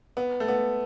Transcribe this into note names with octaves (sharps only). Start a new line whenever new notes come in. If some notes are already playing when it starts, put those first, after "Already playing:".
B3
A3
B3